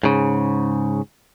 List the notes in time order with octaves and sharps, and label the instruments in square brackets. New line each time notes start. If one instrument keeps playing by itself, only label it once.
[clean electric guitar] G#2 C#3